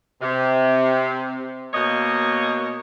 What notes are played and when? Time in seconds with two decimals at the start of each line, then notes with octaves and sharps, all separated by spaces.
0.22 C3
1.73 B2 A#3 C#5 D#5